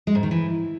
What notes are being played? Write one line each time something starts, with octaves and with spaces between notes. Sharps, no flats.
G#3
G#2
D#3
E3